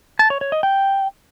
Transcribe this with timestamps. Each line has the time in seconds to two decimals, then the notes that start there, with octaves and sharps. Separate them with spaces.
0.19 A5
0.30 C#5
0.41 C#5
0.52 D#5
0.63 G5